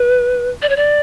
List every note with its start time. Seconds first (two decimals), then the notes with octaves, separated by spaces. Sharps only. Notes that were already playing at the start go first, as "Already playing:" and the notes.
Already playing: B4
0.62 D5
0.69 C#5
0.76 D5